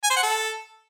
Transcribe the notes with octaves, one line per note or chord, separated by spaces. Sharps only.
G#5
C5
F#5
A4